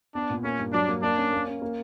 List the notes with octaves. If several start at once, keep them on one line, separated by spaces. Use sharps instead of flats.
B3 D4
A#2
A#3 C#4
G2
F#3 D4
A#3
A#3 D4
C#4
A#3
C#4
A#3